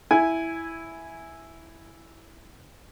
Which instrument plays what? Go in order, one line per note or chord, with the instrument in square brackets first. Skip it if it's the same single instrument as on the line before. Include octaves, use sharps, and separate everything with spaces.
[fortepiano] E4 G#5